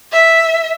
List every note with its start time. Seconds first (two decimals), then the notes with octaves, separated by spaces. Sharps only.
0.12 E5